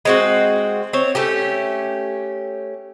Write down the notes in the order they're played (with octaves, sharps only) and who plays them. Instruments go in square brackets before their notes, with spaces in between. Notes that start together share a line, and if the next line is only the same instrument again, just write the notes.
[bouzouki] G#3 C4 F#4
C4 C#5
A3 C#4 G4